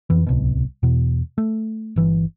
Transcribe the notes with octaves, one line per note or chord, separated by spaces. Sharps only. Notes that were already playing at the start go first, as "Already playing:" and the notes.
F2 E3
D1 C2 B2
E2 B2
A3
G1 E3